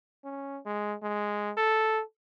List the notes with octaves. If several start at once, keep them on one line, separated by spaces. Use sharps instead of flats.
C#4
G#3
G#3
A4